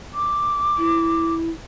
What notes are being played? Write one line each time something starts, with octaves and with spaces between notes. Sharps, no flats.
D6
E4